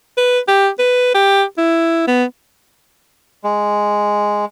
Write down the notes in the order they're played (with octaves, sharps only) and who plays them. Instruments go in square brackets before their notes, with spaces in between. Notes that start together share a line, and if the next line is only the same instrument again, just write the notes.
[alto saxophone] B4
G4
B4
G4
E4
B3
[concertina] G#3